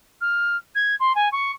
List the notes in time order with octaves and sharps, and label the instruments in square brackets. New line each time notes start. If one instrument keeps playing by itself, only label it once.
[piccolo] F6
G#6
C6
G#5
C#6